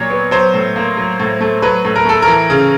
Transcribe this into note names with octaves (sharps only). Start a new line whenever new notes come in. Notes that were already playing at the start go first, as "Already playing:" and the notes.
Already playing: A#2 F#3 C#5
B3
F#3 C5
A2
A#3
F#3
A2
A3
F#3 B4
A2
A#4
A3 A4
A#4
E3
C#3